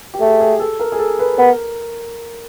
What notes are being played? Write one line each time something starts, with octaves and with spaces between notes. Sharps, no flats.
G4
A3 G#4
G#4
A4
A#4
G#4
A4
B4
B3 A#4